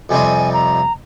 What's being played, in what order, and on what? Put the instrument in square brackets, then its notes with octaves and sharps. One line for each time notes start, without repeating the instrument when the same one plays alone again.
[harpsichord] F2 C3 G3 C4 D#4 [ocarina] G#5
[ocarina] A#5